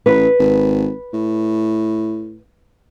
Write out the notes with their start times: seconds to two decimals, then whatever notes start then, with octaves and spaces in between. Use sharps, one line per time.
0.06 A1 B4
0.40 G#1
1.14 A2